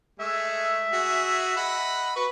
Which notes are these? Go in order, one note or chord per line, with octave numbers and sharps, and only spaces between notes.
G#3 A3 E5
F#4 G#4
D#5 F#5 B5
F#4 B4 C#6